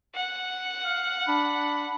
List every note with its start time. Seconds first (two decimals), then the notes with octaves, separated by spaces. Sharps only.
0.15 F#5
0.84 F5
1.28 D4 B5